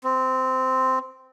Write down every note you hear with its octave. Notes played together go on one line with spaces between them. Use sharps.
C4